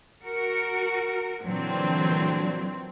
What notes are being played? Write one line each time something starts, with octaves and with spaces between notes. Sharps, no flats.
F#4 A#4 C#7
A#2 D3 E3 F#3 C4 D4